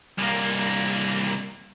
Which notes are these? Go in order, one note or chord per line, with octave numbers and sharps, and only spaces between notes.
C2 A#3